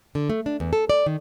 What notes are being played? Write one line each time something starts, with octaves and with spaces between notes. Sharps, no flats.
D3
A3
D4
E2
A4
D5
D#3